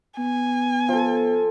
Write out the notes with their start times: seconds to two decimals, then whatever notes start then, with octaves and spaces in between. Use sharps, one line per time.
0.18 B3 G#5
0.89 F3 A4